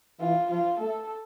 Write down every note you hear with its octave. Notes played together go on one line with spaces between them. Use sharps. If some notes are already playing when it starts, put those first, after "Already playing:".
E3 F4
F3 F4
A3 A4